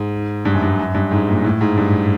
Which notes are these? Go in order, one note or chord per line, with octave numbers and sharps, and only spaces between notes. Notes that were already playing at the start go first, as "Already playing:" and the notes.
Already playing: G#2
G2
F#2
G2
F#2
G2
G#2
A#2
A2
G#2
G2